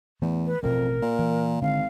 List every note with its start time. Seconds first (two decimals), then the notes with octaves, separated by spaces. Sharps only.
0.22 E2 E3 A3
0.46 B4
0.63 A1 F2 B2 C4 A#4
1.02 A#2
1.19 E3
1.62 G#1 D3 F5